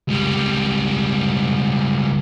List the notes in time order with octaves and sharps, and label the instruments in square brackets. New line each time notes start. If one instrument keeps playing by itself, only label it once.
[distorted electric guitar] C#2 G3